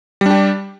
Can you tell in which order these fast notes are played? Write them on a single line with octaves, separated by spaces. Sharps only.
G3 D4 G4